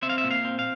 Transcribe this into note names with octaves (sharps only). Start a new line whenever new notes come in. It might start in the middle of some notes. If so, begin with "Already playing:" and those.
C4 E5
F5
E5
A#2
F5
C4
F5